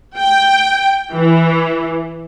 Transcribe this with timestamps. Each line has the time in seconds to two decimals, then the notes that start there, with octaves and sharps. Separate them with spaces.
0.17 G5
1.13 E3